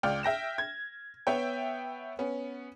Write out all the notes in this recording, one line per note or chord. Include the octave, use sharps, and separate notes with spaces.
C#2 D5 G5 F6
E5 G5 A#6 E7
G#6
B3 C#5 E5 G5
B3 C#4